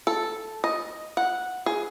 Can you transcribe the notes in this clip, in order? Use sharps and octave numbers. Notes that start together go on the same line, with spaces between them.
A4
D#5
F#5
G#4